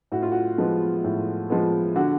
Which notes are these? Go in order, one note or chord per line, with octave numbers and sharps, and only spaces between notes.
A2 F#4
F4
F#4
F3 G#3 B3
A2
F3 G#3 B3
D3 F#4